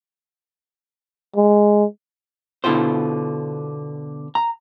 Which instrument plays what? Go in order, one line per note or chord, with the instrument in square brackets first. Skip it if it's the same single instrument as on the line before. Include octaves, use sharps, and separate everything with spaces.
[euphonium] G#3
[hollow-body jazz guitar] B2 D3 E4 F4 C5
A#5